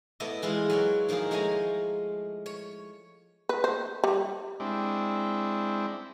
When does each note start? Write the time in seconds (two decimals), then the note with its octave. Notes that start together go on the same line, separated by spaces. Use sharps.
0.20 A3 B3 E4 D5 D#5
0.42 E3 G#3 E4 F4
0.70 F#3 C#5 D5
1.09 D#3 F3 A#3 E4 G#4
1.31 G#3 A3 C5 C#5 G#5 A#5
2.46 C#5
3.49 B4
3.64 C5
4.04 G3
4.60 G#3 C4 D4 E4 G5